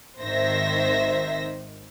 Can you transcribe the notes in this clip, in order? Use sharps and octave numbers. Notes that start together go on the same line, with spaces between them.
G#1 D#3 C5 E5 A#6